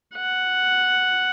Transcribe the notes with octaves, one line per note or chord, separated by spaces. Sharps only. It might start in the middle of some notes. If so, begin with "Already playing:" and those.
F#5